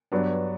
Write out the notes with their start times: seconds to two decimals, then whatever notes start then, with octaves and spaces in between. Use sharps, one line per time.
0.12 G2 F#3 B3 D4